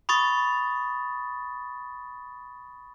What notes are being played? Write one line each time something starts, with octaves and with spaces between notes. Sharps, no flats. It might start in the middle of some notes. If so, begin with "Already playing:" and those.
B5 C#6 D#6 A6